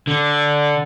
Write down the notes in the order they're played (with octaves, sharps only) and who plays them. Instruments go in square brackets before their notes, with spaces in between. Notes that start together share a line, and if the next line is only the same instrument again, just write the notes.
[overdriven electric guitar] D3